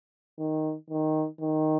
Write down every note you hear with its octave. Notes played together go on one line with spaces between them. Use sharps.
D#3
D#3
D#3